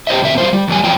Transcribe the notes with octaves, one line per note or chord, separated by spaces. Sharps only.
G4 C5 D#5 E5
E2 B2 C4 E5
G3 F4 C5
G3
E2 F#3 G3 G#5
E2 F3 F#3 F4 G5